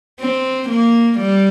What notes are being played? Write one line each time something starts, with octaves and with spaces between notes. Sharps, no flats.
C4
A#3
G3